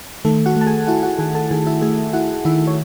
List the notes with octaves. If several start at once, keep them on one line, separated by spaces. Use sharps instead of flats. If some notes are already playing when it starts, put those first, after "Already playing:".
D#3 A3 A4
F#4 F#5
A3
A5
G#4 G#5
E4 F#4 F#5
F#4 F#5
D#3 G#4 G#5
A4 A5
D#3 G#4 G#5
E4 E5
A3 G#4 G#5
E4 F#4 F#5
D#3 E4 E5
C#5